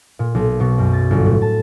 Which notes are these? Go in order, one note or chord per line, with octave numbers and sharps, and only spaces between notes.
A#2
B1
B2
F#2
A6
G1
A2
A5